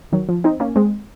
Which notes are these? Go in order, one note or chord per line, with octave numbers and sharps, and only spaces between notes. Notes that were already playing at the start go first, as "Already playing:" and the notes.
D#3 F#3
F3
C4 D#4
A#3 C#4
G#3 C4